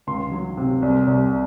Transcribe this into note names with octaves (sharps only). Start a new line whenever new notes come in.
C#2 C6
F#3
C3
C2
C2